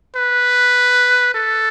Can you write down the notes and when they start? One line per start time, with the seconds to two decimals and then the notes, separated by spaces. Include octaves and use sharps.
0.16 B4
1.34 A4